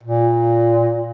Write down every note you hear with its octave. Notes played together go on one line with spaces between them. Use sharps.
A#2